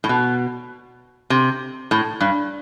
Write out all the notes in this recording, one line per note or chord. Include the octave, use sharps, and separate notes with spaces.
A2
B2
C3
A2
G2